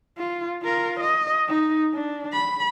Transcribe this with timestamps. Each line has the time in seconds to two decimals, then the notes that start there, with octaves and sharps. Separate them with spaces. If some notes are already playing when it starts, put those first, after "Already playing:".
0.18 F4
0.63 F4 A#4
1.00 D#5
1.48 D#4
1.93 D4
2.33 B5